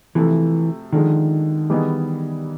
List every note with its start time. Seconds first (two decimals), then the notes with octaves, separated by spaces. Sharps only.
0.15 C3 E3 F3 A3
0.93 D3 D#3 F3 G#3
1.70 E3 G3 B3 D#4 G#4